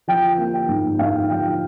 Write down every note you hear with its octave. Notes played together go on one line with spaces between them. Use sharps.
F3 G5
A#3
G5
G#2
G#2 F5
F3 G5